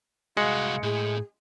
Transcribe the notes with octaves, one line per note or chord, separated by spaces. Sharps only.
C2 G#3 F#4 F5
A2 G#4